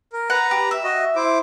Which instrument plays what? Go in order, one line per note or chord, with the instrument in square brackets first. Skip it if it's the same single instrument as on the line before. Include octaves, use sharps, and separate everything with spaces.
[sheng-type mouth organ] A#4
[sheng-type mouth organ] B4 A#5 [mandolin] F#5
[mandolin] G4
E5
[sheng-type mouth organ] F#4 D#5
E4 C5 D6